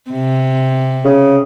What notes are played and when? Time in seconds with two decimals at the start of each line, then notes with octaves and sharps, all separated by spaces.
0.10 C3
1.04 C#3